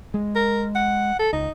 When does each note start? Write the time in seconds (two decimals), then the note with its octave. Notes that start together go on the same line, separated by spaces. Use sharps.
0.14 G#3
0.35 A#4
0.75 F#5
1.19 A4
1.33 C#2 D#4